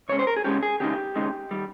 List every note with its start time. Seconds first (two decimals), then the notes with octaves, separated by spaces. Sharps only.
0.09 C#3 G#3 C#4 C#5
0.19 C5
0.27 A#4
0.36 G#4
0.44 C#3 G#3 C#4 G4
0.63 G#4
0.80 D#2 C#3 G#3 D#4 G4
1.16 D#2 C#3 G#3 D#4
1.51 D#3 G3